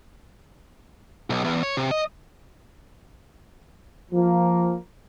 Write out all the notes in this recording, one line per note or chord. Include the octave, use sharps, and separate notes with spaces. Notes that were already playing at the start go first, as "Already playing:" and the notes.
B1
E2
C#5
C3
D#5
F3 A#3